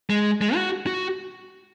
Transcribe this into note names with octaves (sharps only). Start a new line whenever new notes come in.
G#3
G#3
F#4
F#4